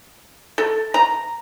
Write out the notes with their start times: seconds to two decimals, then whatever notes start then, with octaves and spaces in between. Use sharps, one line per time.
0.58 A4
0.94 A#5